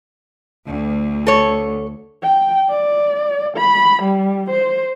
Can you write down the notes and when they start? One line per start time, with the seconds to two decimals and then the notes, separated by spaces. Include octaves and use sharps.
0.66 D2
1.27 A4 C#5
2.22 G5
2.69 D5
3.57 B5
4.03 G3
4.50 C5